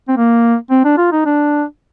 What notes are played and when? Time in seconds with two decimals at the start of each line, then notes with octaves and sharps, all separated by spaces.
0.08 C4
0.17 A#3
0.70 C4
0.85 D4
0.98 F4
1.12 D#4
1.25 D4